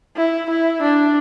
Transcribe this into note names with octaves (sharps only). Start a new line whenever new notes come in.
E4
E4
D4